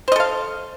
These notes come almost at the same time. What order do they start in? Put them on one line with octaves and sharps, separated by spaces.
C5 D#5 A4 F5